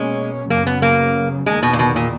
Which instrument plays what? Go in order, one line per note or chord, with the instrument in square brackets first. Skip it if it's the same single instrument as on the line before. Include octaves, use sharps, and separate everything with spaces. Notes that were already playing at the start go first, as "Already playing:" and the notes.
Already playing: [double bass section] B2 A#3 C#4 [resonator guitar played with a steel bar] G#3
[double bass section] F#2 C#3 F#3 [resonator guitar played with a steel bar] A#3
[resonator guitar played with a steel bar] B3
A#3
[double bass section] E2 D#3 A#3 [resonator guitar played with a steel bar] G#3
[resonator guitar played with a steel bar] B2
A#2
B2
A#2